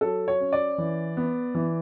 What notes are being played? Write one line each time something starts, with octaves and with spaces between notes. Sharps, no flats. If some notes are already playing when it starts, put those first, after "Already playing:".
F#3 A4
C#5
C#4
D5
E3
B3
E3